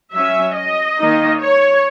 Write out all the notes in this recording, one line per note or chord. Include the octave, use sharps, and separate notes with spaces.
F#3 C#4 E5
D#5
D#3 A#3 D#4
C#5